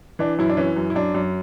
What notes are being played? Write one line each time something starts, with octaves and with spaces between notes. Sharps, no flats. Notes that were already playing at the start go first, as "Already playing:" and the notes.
E3 D4
F#2 E4
D4
E3 C#4
F#2
E4
F#2 D4
F#2